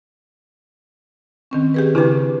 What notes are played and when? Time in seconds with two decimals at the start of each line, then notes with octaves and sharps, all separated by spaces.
1.51 D#3 C4 C#4
1.74 G4 G#4 B4
1.95 C#3 D4 E4 G4 B4